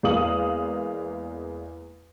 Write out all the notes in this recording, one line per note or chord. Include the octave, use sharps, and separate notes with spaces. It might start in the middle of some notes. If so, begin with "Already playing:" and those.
E2 G#3 A#3 F5 D#6 F#7